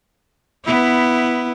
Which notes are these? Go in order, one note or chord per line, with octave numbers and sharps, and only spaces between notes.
B3 E4